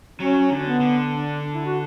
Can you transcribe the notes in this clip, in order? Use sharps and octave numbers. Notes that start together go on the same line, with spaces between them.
F#3 C#4
D3
B3
D3
D4
E4
F#4